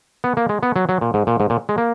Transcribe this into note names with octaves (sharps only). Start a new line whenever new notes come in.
B3
A#3
G#3
B3
F#3
F#3
A#2
G#2
A#2
G#2
A#2
G#3
A#3